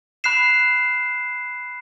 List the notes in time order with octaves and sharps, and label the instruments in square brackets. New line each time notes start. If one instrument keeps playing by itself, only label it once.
[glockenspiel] B5 F#6 C7 E7